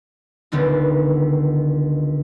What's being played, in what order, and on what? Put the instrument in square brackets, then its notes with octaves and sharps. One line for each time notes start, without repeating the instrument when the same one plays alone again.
[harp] D#1 C#2 D3 B3 D#4